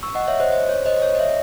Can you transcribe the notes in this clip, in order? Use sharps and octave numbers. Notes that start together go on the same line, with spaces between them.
C#6 E6
D#5 F#5
C#5 E5
C5 D#5
C5
C#5
C5 D#5
D#5
C#5
D#5
C#5 E5